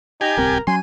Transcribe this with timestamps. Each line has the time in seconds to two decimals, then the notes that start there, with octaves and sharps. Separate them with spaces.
0.21 D#4 G4 G#5
0.37 D1 C2 C4 A#4
0.67 F#3 C#4 G#5 C6